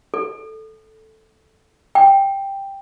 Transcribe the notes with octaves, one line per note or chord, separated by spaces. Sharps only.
A4
G5